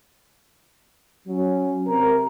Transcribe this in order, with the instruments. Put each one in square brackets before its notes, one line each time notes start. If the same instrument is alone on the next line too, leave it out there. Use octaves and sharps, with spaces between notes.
[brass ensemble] F#3 [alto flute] C#4
[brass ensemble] C3 A#4 [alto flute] A#5